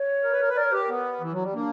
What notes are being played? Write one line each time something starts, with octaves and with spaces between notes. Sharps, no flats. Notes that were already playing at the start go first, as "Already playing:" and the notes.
Already playing: C#5
A#4
B4
A#4
B4
A#4 D5
C#5
G4 B4
A#4
B3
E3
F#3
G3
A#3 D4